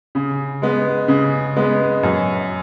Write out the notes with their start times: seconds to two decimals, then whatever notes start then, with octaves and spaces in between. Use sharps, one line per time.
0.15 C#3
0.62 G#3 B3
1.08 C#3
1.56 G#3 B3
2.03 F#2